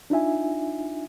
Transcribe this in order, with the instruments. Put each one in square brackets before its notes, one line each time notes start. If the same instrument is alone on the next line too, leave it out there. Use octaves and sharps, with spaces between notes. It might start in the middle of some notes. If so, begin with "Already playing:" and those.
[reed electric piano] D4 D#4 F4 E5 G#5